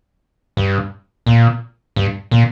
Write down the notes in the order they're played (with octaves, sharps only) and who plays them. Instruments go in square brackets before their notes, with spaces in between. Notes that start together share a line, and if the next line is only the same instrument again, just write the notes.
[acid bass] G2
A#2
G2
A#2